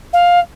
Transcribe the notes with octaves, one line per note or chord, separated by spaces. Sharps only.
F5